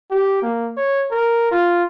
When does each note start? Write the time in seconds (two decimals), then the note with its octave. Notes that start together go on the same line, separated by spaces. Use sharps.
0.11 G4
0.42 A#3
0.77 C#5
1.11 A#4
1.52 F4